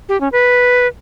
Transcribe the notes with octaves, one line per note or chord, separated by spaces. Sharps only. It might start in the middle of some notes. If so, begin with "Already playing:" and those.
G4
C#4
B4